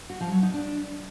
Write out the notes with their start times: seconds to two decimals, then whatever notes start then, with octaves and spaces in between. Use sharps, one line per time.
0.10 F#4
0.21 F3
0.32 F#3
0.43 D#4
0.54 D4